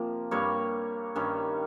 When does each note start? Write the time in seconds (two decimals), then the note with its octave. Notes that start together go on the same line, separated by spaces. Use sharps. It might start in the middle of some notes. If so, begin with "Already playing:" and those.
Already playing: C3 F3 A#3
0.31 G2 G3 A#3 C#5
1.16 G2 D#3 G3 C#4